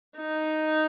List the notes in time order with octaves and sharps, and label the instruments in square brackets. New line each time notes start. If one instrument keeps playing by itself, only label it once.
[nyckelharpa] D#4